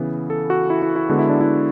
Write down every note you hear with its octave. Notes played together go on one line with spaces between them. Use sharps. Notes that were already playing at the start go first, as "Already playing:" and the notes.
Already playing: C#3 E3 B3
A4
F#4
E4
E4
E4
D3 G#3 B3 F#4
E4
D4
E4